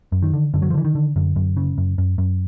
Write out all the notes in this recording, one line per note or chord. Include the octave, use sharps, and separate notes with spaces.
F#2
D#3
D3
F#2 D3
F#3
F3
D3 E3
D#3
D3
F#2 D3
F#2
C#3
F#2
F#2
F#2